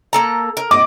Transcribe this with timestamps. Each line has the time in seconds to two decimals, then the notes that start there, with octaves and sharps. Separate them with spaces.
0.13 A#3 A4 A#5
0.57 A#4
0.71 D#5 D6